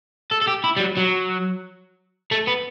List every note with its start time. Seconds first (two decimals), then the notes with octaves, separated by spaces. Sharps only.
0.31 A4
0.41 A4
0.47 G4
0.64 E4
0.76 G3
0.80 F#3
0.97 F#3
2.31 A3
2.47 B3